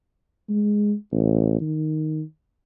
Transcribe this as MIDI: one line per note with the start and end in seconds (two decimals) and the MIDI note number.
0.49 0.94 56
1.12 1.57 33
1.61 2.22 51